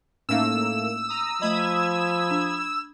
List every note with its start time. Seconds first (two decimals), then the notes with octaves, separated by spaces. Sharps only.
0.29 A2 A3 A#3 C#4 D#4 F5 E6
1.08 A#5 D#6
1.42 F3 A3 D#5 B5 D#6 G#6
2.31 D4